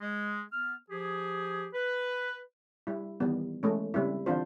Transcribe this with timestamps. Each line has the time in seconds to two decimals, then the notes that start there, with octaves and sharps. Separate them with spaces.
0.01 G#3
0.53 B3 F6
0.90 F3 G4 G#4
1.74 B4
2.87 G3 E4
3.20 D#3 E3 G3 B3
3.63 E3 G#3 A3 C#4
3.94 C#3 G3 C4 E4
4.26 D3 E3 C4 D4 F4 C5